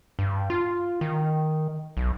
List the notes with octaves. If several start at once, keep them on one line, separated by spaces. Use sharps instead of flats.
G2
F4
D#3
B1